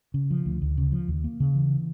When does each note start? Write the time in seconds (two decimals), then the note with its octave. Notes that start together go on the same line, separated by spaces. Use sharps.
0.14 C#3
0.31 F3
0.46 D2
0.62 D2
0.78 C#3
0.92 F3
1.08 D#2
1.24 A#3
1.40 C#3
1.55 E3